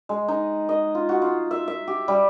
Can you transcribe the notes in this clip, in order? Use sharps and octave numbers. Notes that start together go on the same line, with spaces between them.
G#3
D#4
D#5
F4
F#4
F4
E5
E5
G4
G3